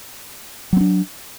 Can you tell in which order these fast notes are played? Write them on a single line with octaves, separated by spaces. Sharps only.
F#3 C4 D4